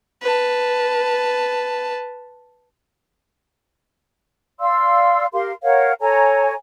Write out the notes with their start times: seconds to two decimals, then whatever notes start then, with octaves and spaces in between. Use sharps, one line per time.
0.22 B4 A5
4.60 D5 F5 C6 E6
5.33 G4 A#4 F5 C6
5.63 A#4 C#5 F5 F#5
6.00 A4 C#5 G#5 A#5